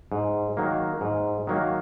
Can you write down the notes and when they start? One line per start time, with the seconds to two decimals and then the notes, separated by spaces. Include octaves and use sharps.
0.12 G#2
0.57 D#3 F#3 A#3
1.01 G#2
1.47 D#3 F#3 A#3